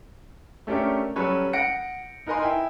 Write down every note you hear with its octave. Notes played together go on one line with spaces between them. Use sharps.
A3 C#4 D4 G4 A#4
F#3 G3 C#4 A4 B4 C#5
F#5 A#6 C#7 D7
D#4 A#4 B4 D#5 G#5 C6
E4 G5 G#5